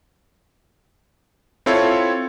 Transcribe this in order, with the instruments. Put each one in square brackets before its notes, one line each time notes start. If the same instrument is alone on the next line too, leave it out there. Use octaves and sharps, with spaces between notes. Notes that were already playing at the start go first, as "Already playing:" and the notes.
[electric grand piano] C4 E4 F4 A4 C#5